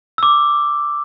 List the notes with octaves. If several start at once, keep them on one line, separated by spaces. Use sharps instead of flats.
D6 E6